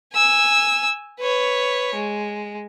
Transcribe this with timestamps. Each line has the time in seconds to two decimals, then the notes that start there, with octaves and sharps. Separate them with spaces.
0.14 G#5 E6
1.20 B4 C#5
1.95 G#3